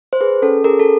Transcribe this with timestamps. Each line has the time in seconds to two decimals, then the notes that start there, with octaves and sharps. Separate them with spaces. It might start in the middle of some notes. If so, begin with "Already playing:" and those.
0.13 C5
0.21 G#4 B4
0.42 C#4 A4
0.64 G#4 A#4
0.80 A4